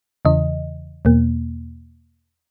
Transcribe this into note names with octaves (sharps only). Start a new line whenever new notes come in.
E2 C#3 E3 D#5
E2 B2 A#3